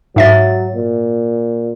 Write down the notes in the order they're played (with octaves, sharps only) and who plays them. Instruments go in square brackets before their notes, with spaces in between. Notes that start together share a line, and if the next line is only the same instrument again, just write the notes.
[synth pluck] G#2 E5 A6 [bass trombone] F#3
[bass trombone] A#2